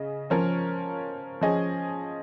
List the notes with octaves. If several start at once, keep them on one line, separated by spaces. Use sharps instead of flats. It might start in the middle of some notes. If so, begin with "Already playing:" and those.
Already playing: C#3 D#5
F3 C#4 A#4 C#5
F3 C#4 G#4 D#5